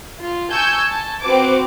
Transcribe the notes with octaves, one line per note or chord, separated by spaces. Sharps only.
F4
G#5 A5 C#6 E6 G6 G#6
A5
C4 F#4 B4 C5 D6